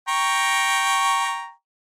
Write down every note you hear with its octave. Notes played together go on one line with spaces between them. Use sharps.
G5 A#5 C#6